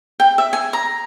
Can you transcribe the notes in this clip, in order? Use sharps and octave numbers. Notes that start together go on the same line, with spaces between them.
G5
E5
G#5
A#5